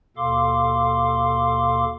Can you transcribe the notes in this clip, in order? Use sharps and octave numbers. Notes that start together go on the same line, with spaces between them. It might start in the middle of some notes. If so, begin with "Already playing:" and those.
D#2 B2 A4 F5 C6 D6